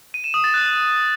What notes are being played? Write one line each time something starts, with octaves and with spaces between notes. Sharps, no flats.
D#7
E7
D#6
A6
F#6